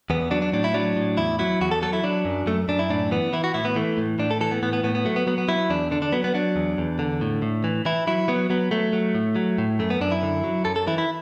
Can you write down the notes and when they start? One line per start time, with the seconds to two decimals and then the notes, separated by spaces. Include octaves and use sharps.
0.10 E2 B3
0.31 F#3 D4
0.42 D4
0.53 A2 D4
0.64 E4
0.74 F#3 D4
0.96 A2
1.17 E2 E4
1.39 F#3 E4
1.61 E2 F#4
1.71 A4
1.82 F#3 A4
1.93 E4
2.04 F#3 D4
2.25 F#2
2.46 F#2 A3
2.68 F#2 D4
2.79 E4
2.90 A2 D4
3.11 E3 B3
3.33 E3 E4
3.44 F#4
3.54 A2 E4
3.65 B3
3.76 E3 A3
3.98 A2
4.19 A2 D4
4.31 A4
4.41 E3 A4
4.51 B3
4.63 A2 B3
4.73 B3
4.84 A2 B3
4.95 B3
5.05 F#3 A3
5.16 B3
5.27 F#3 B3
5.38 B3
5.48 F#3 E4
5.70 E2 D4
5.91 D3 D4
6.02 D4
6.12 F#3 B3
6.24 B3
6.34 F#3 D4
6.56 E2
6.78 E2
6.99 D3
7.21 A2
7.42 A2
7.64 E3
7.85 E3 E4
8.07 F#3 E4
8.28 F#3 B3
8.50 F#3 B3
8.71 F#3 A3
8.93 F#3
9.15 A2
9.36 F#3
9.58 A2
9.79 F#2 A3
9.90 B3
10.01 F#2 D4
10.12 E4
10.23 D3
10.44 F#3
10.65 F#2 A4
10.76 A4
10.87 E3 E4
10.98 E4